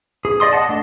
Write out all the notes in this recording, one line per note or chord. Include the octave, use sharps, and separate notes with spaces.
G#4
D5 D#5 C6 D#6
D#5 F#5 A5
A3 D4